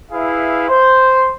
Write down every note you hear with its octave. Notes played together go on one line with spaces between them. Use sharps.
E4 G#4 B4 E5 F5
C5